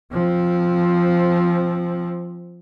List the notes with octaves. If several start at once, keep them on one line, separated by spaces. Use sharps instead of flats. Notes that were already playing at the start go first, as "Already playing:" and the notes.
F3 C4